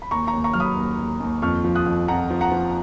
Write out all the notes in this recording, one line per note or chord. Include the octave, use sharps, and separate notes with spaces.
B5
D#2 A#5 C#6
A#5 C#6
D#2
A#5 C#6
F#3 F6
B5 D#6
D#2
D#2
D#2
F2 C#6 F6
F3
D#6 F#6
F2
F2 F#5 A#5
F3
F#5 A#5
F3